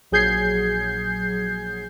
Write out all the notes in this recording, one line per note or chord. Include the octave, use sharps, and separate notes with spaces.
A#1 F#3 G#4 G6 G#6 C7